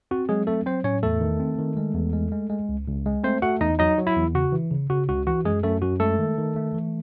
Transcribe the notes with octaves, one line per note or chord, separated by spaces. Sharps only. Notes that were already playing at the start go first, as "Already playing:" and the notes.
C4 F#4
F#3 G#3 G#4
A3 C4 A4
F#3 C4 C5
A2 C#4 C#5
E2 A3 A4
D#3
C4
D#3
G#3
E2
G#3
G#3
G#3
C#2
C#2
G#3
A3 C4 C5
A3 F#4 F#5
E2 D#4 D#5
F#3 D#4 D#5
F#3
E4
E2
C#3 F#4
E3
C#3
C#3 F#4
C#2 F#4
E3 F#4
F#2 G#3 G#4
F#2 A3 A4
F#2 F#4
G#3 A3 A4
D#3
D#3
A3
E3